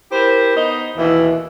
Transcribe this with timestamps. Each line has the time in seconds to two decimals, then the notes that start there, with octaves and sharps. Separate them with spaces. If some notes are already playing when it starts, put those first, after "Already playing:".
0.11 E4 G4 A#4 C5
0.56 B3 D#4 C5 D#5
0.97 D#2 B2 E3